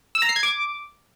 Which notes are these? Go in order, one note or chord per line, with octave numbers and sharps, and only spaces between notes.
E6
A#5
C7
G#6
D6